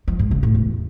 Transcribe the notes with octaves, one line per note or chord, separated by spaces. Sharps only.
F3
G#2
C#3
A2
E2